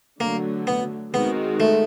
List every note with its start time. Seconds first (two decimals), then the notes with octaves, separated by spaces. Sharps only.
0.20 D3 F#3 A3 A#3
0.67 B3
1.13 D#3 G#3 B3 C4 D#4 F#4
1.60 A3